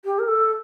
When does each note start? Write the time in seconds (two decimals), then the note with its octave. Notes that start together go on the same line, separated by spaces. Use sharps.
0.05 G4
0.19 A#4
0.28 A4